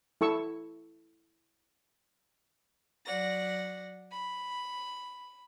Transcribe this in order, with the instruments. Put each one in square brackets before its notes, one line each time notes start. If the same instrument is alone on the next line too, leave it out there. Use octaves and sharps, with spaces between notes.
[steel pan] E4 A4 C#6 E6
[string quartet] F#3 D5 F#5 A#6
B5